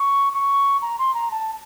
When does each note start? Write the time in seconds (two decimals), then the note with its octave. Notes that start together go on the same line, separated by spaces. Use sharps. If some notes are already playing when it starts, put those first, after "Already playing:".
Already playing: C#6
0.34 C#6
0.82 A#5
0.99 C6
1.14 A#5
1.31 A5